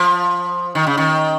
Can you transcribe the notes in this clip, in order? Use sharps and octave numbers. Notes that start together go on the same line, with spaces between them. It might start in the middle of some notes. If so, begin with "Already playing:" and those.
Already playing: F3
D#3
C#3
D#3